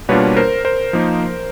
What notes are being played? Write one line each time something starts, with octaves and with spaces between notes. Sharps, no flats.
B2 G3 A#3 D4 F4 B4 C#5
A#4 C5
A#4 C5
F3 A#3 D#4